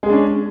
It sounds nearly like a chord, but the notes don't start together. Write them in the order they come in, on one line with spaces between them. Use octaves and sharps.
G#3 G#4 D4 C#4